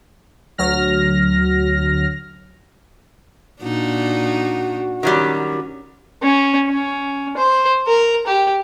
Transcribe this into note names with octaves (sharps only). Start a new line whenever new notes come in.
D2 F#3 F6 A#6
A#2 D4 D#4 F#4
D#3 F#3 G3 C#4
C#4
C#4
C5
A#4
G4